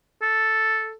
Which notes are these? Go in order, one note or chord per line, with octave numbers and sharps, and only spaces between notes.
A4